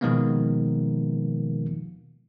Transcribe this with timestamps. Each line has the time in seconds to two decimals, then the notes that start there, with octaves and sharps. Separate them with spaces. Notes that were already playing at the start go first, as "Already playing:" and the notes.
0.01 B2 D#3 F3 G#3 A#3 B3